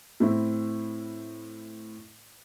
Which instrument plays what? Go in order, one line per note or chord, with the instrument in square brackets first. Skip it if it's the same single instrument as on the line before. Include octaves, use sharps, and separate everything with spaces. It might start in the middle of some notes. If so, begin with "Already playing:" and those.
[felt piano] A2 C4 E4